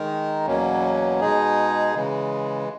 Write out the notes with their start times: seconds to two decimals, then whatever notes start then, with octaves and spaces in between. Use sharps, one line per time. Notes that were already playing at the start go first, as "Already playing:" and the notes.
Already playing: D#3 G#3 D#4 A#4
0.46 E2 B2 F#3 A#3 C#4
1.20 B2 G#3 D#4 G#4
1.95 C#3 E3 G#3